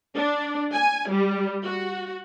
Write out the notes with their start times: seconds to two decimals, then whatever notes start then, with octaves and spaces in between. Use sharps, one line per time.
0.16 D4
0.73 G#5
1.10 G3
1.65 F#4